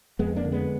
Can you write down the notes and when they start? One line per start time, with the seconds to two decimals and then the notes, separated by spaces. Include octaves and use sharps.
0.19 F2 G#3 B3
0.36 A#3 D4
0.45 D3
0.52 G#3 B3